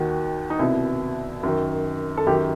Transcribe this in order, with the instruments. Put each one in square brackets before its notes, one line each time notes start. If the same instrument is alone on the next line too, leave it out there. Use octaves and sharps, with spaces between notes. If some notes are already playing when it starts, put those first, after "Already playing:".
Already playing: [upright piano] D#2 D#3 F#4
D#4
C2 B2 E4
F#2 D#3
A4
F#2 D#3 G4